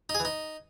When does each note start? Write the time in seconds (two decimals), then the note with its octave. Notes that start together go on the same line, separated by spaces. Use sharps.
0.09 D#4
0.15 G#4
0.20 E3
0.25 D#4